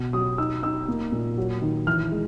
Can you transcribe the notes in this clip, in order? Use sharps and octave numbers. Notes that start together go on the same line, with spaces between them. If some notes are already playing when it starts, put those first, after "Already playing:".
Already playing: B2
F#3 D#6
D#4 E6
D#4 E6
A#3
A#2
F#3
D#3
E3 F6
G#3